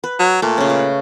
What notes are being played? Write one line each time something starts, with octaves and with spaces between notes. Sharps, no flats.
B4
F#3
A#2 A3
C#3 C#4
B4